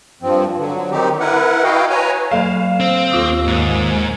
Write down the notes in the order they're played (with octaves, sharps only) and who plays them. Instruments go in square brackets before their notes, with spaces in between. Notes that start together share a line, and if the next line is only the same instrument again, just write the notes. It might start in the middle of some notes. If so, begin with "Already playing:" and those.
[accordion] G2 F3 C4
D3 F#3
D#3 C4 D#4 G4
E4 A#4 B4 F#5
E4 F#4 D#5 F5 G5
B4 C#5 G#5 A#5
[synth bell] F#3 A4 E7 [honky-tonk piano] F5
[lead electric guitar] C4
[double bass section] D#2 [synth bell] F4 D6 D#6
[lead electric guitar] G#2